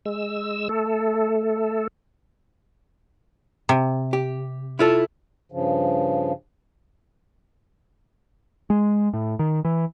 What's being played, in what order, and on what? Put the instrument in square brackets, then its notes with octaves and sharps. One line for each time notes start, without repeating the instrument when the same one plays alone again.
[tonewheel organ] G#3 E6
A3 A4
[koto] C3
[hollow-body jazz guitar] G4
E4 F4 A4
[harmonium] G2 C#3 F3
[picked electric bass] G#3
A2
D#3
E3